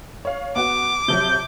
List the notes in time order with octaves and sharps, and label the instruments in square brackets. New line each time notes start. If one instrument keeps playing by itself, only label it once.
[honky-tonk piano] C#5 F5
[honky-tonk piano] B3 F#4 [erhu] D6
[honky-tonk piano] C3 F3 F#3 [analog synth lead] G6